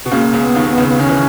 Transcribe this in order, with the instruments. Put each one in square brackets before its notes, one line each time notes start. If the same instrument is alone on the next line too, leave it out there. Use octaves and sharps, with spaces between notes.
[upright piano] B2
[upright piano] C#2 C#3 [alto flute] A#3
[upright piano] C#2 C#3
[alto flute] B3
[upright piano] D#2 D#3
[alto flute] B3
[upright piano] C#2 C#3
[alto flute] B3
[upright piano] D#3 [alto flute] C#4
[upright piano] E3